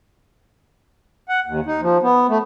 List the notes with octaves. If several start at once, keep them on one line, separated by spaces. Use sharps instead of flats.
F#5
D#2
D#4
F3
B3
A3